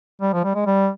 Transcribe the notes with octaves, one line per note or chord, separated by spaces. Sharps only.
G3
F3
G3
G#3
G3